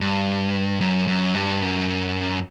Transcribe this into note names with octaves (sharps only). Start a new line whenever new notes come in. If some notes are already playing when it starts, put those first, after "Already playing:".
G2
F#2
F#2
G2
F#2